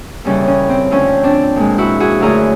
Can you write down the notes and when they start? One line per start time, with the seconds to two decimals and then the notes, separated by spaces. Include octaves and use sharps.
0.24 D#2 C#3 E3 G3 C#4
0.47 C#4
0.69 C4
0.91 D2 D3 F3 C#4
1.23 C4 D4
1.56 A#2 F3 G#3
1.78 E4 F#4
2.00 F#4 G#4
2.20 F#2 D3 F#3 A3 G#4 A#4